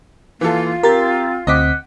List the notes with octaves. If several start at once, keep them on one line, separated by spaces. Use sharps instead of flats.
E3 A#3 F4 A4
C4 G4 A#4 A6
D2 C4 D#5 F#5 D6 B6